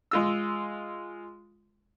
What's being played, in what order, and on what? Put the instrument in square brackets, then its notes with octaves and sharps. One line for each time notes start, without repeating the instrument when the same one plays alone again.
[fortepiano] G#3 F4 E6